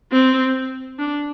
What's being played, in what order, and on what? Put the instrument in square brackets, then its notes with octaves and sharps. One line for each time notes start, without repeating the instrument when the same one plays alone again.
[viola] C4
D4